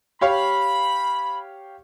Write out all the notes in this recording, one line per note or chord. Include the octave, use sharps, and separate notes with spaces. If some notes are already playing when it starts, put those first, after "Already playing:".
G4 C#5 F5 B5